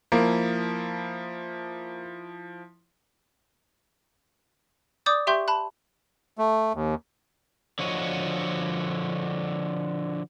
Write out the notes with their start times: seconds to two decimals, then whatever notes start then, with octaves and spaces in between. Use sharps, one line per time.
0.12 F3 A#3 E4
5.06 D5 D6 D#6 G6 A6
5.27 G4 E5 G5 C6 C#6 G6
5.48 A5 B5 F#6
6.38 A3
6.74 D#2
7.79 D3 F3 F#4 C#5 D#5